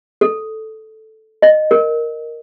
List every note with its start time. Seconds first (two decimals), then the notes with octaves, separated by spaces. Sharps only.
0.21 A4
1.42 D#5
1.71 A#4